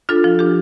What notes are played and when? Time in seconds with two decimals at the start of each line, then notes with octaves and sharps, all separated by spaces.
0.09 D4 F4 A4
0.24 F3
0.39 D4 G4